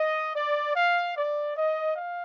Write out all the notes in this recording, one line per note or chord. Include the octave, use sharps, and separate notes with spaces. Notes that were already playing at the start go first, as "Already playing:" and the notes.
Already playing: D#5
D5
F5
D5
D#5
F5